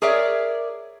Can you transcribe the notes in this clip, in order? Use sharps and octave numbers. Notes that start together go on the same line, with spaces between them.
G#4 A#4 C#5 D5 E5